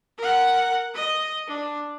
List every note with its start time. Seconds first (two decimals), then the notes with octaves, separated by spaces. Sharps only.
0.18 A#4 F#5
0.94 D#5
1.47 D4